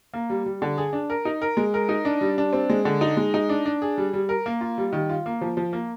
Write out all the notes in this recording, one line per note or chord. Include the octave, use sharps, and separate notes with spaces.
A#3
G3
G3
D3
G#4
D4
A#4
D#4
A#4
G#3
A#4
D#4
D4
G3
D4
C4
G#3
D3
D#4
G#3
D#4
D4
D4
G#4
G3
G3
A#4
A#3
F4
G3
D#3
F4
A#3
F3
F3
A#3